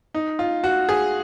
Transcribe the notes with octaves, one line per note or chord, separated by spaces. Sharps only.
D#4
F4
F#4
G#4